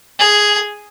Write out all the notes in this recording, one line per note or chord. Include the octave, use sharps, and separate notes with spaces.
G#4